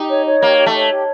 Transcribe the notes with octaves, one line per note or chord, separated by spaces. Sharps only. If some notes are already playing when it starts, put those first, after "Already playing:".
Already playing: D#4 G4
C#5
C#5
A#3 G4
G4
A3
C#5
G4